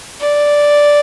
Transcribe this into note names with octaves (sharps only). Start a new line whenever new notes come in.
D5